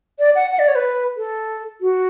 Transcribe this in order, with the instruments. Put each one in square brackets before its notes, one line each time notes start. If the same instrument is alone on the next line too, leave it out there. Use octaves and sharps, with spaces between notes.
[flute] D5
F#5
F#5
D5
C#5
B4
A4
F#4